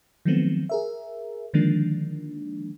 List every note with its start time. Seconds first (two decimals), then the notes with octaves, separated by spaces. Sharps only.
0.25 D#3 F3 F#3 A3 B3 C4
0.69 G#4 A#4 E5
1.54 D3 D#3 F3 G#3 A#3 D4